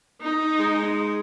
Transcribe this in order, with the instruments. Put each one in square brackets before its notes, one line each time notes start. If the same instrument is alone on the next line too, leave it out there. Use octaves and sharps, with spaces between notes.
[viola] D#4
[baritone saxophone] G#3